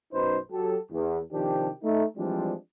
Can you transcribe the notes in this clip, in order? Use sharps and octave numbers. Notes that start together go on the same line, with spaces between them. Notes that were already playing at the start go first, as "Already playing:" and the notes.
B1 F#2 D#4 B4 C5
F#3 G4 A4
E2
C3 D#3 F3 D4 G4
A3 D#4
E3 F3 G3 G#3 C4 D4